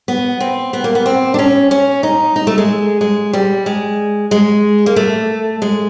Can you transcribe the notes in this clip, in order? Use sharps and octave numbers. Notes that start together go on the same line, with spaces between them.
B3
C4
B3
A#3
B3
C4
D4
C#4
C#4
D#4
D#4
A3
G#3
G#3
G3
G#3
G#3
A#3
A3
G#3